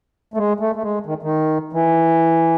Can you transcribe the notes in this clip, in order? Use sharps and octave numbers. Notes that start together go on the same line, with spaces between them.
A3
G#3
A3
A3
G#3
D#3
D#3
E3